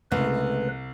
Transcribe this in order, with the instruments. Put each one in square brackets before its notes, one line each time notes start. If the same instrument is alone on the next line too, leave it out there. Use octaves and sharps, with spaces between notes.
[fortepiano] C2 [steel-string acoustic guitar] C#3 G#3 A3 [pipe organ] B4